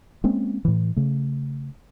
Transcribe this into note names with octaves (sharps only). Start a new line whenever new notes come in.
G#3 A#3 C4 C#4
A2 E3
C#3 A3